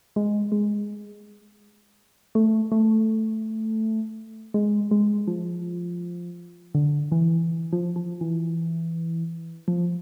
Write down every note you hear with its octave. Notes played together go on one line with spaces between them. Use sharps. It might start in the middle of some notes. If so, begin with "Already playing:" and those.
G#3
G#3
A3
A3
G#3
G#3
F3
D3
E3
F3
F3
E3
F3